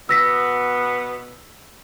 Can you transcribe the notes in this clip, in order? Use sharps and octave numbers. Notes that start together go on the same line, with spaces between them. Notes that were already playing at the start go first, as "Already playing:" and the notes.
B2 B3 E6 A#6 B6